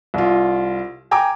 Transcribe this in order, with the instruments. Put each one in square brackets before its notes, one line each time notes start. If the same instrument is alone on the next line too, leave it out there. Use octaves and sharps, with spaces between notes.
[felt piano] C2 F4
G5 G#5 A#5 D6